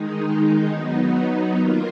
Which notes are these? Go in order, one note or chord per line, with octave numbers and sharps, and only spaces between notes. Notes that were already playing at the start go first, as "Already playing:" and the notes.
Already playing: D#3 G#3 D#4
F#3 B3 D#4
D#3 A#3 F4 A#4